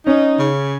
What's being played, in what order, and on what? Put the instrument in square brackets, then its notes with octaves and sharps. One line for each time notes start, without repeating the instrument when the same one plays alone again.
[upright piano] C#4 [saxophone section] D#4
[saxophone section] C#3